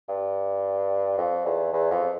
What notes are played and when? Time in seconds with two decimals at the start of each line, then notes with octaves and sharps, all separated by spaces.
0.09 G2
1.18 F2
1.46 E2
1.73 E2
1.91 F2